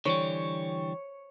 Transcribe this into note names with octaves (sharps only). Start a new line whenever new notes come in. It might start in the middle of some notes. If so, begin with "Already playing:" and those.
D3 E3 G3 C#5